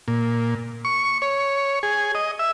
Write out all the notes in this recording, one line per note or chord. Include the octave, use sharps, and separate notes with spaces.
A#2
C#6
C#5
G#4
D#5
E5